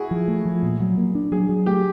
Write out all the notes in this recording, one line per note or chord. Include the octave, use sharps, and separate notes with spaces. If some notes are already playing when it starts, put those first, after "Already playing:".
Already playing: E4 F#4 G#4
F3
A3
F3
A#2
F#3
A#3
D4
F#3 G#4
F#3
A3 G4